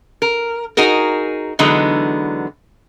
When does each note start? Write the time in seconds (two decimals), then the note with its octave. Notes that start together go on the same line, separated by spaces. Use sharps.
0.22 A#4
0.77 D#4 F#4 G#4 A#4
1.59 D3 E3 F#3 G#3 B3 D#4